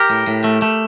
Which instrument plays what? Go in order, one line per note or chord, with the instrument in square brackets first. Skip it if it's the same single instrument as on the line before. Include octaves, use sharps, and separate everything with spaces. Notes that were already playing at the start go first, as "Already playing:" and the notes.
Already playing: [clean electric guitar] G4 A#4
A2
A2
A3
A3